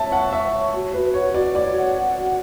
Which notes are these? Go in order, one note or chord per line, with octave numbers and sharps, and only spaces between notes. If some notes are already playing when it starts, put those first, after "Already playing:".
Already playing: C#5 E5 A5
F#5 C#6
E5 C#6
C#5
F#4
F#4 B4
C#5 F#5
F#4 D5
C#5 D5
F#5
F#5
F#4